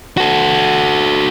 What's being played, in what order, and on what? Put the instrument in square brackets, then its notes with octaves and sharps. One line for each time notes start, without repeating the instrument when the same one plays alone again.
[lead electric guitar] F#4 A4